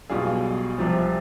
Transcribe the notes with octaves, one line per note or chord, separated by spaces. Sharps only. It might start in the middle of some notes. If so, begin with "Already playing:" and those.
B1 B2 G3 F4 G#4
C2 C3 F3